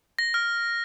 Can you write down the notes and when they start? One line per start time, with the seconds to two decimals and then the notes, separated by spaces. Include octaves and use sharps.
0.19 A#6
0.34 F6